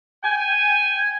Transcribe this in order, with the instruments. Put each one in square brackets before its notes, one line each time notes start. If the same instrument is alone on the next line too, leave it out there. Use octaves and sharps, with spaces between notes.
[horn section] G5 G#5